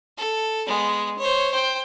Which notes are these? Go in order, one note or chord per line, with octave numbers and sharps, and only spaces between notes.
A4
G#3 B3
C5 C#5
C5 G5